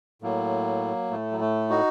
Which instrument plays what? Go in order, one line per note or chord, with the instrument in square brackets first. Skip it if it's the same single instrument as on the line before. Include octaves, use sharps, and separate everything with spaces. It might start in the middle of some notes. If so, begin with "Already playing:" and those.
[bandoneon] A2 F#3 A#3
A2 A3
F#3
A3
D#4 F#4